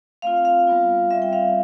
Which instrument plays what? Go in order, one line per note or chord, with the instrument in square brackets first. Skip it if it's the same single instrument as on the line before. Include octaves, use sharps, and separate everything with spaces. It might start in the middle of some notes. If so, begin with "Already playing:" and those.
[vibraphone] A3 C4 F4 F5
F5
G3 B3 F4
G3 C4 F4 E5
G5
F5